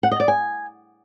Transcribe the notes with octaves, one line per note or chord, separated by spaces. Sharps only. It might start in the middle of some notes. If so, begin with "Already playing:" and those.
F#5
D#5
D5
G#5